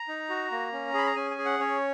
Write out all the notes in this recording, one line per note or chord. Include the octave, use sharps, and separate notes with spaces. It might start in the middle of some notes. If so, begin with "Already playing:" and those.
Already playing: A#5
D#4
F#4
A#3
C#4
G#4 B5
A#5
C#4 G#5
G#5
G#4
F#5
C#4 C#5